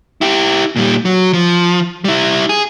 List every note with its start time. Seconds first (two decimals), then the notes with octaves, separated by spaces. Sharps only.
0.21 E4 G4
0.76 A#2 G3
1.05 F#3
1.33 F3
2.04 G3 E4
2.49 G#4